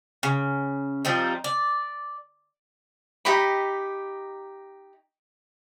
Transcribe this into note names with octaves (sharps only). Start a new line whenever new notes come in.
C#3
F3 G3 C4 D#4
D5
D#4 G4 D#5 B5